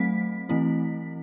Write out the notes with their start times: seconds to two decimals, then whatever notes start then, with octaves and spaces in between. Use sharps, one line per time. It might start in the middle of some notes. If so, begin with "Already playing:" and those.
Already playing: F#3 A3 C4 B6
0.49 E3 A3 C4 E4